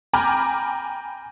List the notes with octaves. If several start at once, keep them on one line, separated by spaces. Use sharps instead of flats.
G5 G#5 A#5 B5 D6 F6